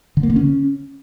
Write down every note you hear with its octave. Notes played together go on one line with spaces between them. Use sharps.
D3
A#3
D3
C#4